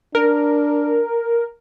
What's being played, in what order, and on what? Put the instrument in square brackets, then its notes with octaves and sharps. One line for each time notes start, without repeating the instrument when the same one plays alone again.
[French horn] D4 [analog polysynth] A#4